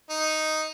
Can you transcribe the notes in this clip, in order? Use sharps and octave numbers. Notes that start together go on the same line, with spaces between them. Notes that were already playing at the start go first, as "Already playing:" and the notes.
D#4